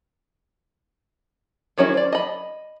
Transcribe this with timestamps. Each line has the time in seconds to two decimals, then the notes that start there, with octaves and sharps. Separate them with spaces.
1.78 D#3 F#3 C#4 E4 G#4
1.94 C5 D5
2.13 D#5 B5